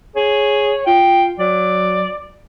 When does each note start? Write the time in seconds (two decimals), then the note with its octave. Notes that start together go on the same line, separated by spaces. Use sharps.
0.16 G#4 C#5
0.86 F4 G5
1.39 F#3 D5